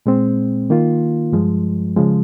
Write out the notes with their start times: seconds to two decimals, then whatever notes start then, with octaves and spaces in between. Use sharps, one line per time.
0.06 A#2 G#3 C4
0.70 D#3 A#3 F4
1.32 G2 F3 G#3
1.96 C#3 F3 G#3